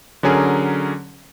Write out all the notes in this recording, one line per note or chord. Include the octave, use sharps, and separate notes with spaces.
D3 F#3 C#4 G#4 A#4